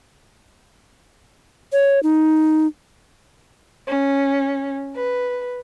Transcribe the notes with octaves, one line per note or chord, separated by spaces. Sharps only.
C#5
D#4
C#4
B4